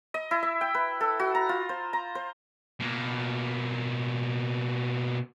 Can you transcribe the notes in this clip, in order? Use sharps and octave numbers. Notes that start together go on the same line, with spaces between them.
D#5
E4
E5
G5
B4
A4
F#4
A#5
F4
C5
A#5
C5
B2 A#3